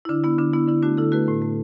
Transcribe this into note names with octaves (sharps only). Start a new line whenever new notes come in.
E4
D3 D4
B3 E4
D3 D4
B3 E4
D3 E4
A3 D4 F#4
D3 E4 A4
A3 F#4 B4
A2
A3